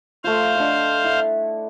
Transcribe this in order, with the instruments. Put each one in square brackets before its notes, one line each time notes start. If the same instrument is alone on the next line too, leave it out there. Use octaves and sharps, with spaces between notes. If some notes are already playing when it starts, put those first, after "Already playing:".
[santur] A3 F4 [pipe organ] C5 F5
[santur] D4 D#5 F#5
E4